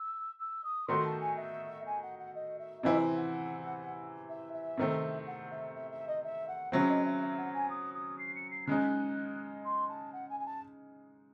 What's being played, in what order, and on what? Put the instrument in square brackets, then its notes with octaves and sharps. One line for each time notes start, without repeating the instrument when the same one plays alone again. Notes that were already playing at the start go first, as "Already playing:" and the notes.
Already playing: [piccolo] E6
E6
D#6
[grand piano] D#3 A3 D#4 F#4 [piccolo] C6
[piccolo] A5
G#5
E5
G#5
F#5
F#5
D#5
E5
[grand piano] C3 E3 C4 E4 [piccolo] D#5
[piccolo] E5
F#5
E5
E5
[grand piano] C3 D#3 A3 C4
[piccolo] F#5
E5
E5
E5
D#5
E5
F#5
[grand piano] C#3 F#3 C4 [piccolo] E5
[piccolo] D#5
E5
E5
F#5
G#5
D#6
D#6
C7
C#7
C7
[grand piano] C#3 G#3 D#4 [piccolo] F#6
[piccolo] C6
A5
F#5
G#5
G#5
A5